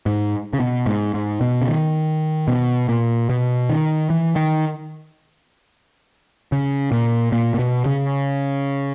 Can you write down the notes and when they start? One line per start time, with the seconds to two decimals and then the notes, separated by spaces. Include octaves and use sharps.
0.06 G#2
0.53 C#3
0.60 B2
0.86 G#2
1.14 G#2
1.41 B2
1.62 C#3
1.68 D#3
2.48 B2
2.89 A#2
3.29 B2
3.70 D#3
4.10 E3
4.36 D#3
6.52 C#3
6.92 A#2
7.32 A#2
7.54 A#2
7.59 B2
7.86 C#3